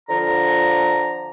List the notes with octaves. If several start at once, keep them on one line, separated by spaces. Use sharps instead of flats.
D3 F3 A#5